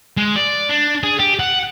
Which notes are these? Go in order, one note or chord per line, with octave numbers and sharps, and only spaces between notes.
G#3
D5
D4
G#4
G4
F#5